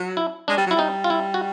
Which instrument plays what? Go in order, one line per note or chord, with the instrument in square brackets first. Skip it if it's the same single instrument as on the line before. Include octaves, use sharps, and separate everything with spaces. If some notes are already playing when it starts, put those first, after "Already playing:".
Already playing: [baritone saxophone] F#3
[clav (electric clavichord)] E4
[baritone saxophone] G#3 [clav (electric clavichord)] D4
[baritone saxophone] G3
F#3
[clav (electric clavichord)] E4
[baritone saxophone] G3 [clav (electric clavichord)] D#4
[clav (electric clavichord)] F4
E4
F#4